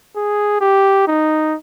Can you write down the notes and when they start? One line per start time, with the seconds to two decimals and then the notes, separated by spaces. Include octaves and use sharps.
0.16 G#4
0.61 G4
1.07 D#4